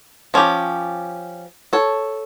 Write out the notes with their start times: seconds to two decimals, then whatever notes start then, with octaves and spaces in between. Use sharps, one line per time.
0.34 F3 C#4 G4
1.73 A4 C#5